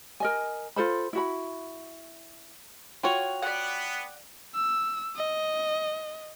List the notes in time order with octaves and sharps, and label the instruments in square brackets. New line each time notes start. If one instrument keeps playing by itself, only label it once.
[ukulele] A#4 D#5 G#5
F4 A4 C5 B5
E4 F#4 B5
[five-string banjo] F4 F#4 C#5 [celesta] G5 F7
[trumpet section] B3 [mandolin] D5 F#5
[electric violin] E6
D#5